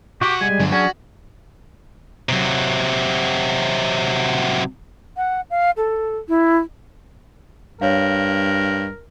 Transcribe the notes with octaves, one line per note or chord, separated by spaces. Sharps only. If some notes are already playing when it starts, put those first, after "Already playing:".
B1 F#4 G4 F#5 D6
G3 G#3 G#5
G2 D3 F#3
C#4 D4 F#4 G#4 G#5
C3 F#3
F#5
F5
A4
E4
G2 A#4 C#5 F5